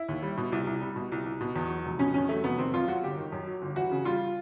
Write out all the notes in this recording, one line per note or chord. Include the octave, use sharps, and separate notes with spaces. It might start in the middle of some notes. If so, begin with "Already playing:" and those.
Already playing: E4
D#2
G3
B2
C2
C2
G3
B2
C2
C2
B2
E2
F#3
F1
B2 C#4
E2 C#4
F#3 A3
F1 B3
D#3 C4
F#2 F4
F#3 F#4
G1 G4
D#3
F#2
F#3
G1
E3 F#4
C#3
G3 F4